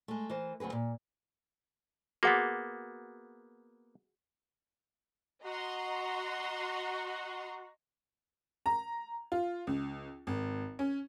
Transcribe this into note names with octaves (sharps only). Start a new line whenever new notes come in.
G#3 A3
E3 A#4 C5
D2 F#3 C4 G#4 B4
A#2
A#3 B3 F#4 G#4 F#5
F#4 D#5 A#5 C6
A#5
F4
C#2
G#1
C#4